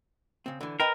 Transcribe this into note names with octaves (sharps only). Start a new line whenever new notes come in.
C#3 C4
D3 E3
A#4 B4 D#5 G5